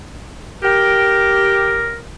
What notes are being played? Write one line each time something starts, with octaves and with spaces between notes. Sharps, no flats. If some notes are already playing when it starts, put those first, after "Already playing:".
G4 A#4